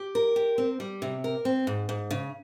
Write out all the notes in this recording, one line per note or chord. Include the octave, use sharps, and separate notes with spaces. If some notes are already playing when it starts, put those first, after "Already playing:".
Already playing: G4
A#4
G4
C4
G3
C3
A#4
C4
G#2
G#2
C#3